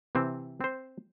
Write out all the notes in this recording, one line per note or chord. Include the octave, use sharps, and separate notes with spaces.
C3 E3 C4
C4 C5